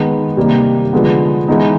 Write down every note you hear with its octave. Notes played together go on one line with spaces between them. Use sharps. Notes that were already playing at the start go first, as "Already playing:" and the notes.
Already playing: D#3 G#3 B3
C3 D#3 G3 A#3
D3 F3 G#3 B3
E3 G#3 B3 D#4